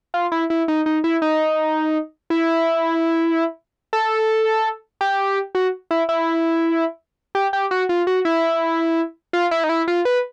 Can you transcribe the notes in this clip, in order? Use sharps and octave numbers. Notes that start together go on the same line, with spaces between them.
F4
E4
E4
D#4
D#4
E4
D#4
E4
A4
G4
F#4
E4
E4
G4
G4
F#4
F4
F#4
E4
F4
E4
D#4
E4
F4
B4